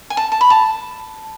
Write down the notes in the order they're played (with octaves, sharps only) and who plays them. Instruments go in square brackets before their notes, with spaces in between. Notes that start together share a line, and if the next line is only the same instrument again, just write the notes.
[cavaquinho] G#5
A5
A5
B5
A5